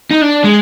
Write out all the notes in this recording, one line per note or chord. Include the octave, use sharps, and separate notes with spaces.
D#4
D4
G#3